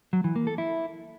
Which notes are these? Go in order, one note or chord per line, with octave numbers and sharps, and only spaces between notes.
F#3
E3
A#3
A4
E4